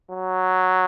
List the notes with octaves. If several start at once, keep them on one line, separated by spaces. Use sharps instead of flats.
F#3